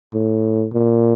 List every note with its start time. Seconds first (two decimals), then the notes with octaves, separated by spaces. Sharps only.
0.14 A2
0.73 A#2